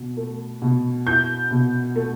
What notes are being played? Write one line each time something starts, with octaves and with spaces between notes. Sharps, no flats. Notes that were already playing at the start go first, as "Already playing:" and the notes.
Already playing: B2
A3
B2
E4 G6
B2
A3